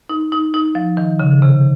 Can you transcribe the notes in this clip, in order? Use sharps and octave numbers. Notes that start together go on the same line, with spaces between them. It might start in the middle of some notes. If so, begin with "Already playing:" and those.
D#4
D#4
D#4
F3
D#3
C#3
C3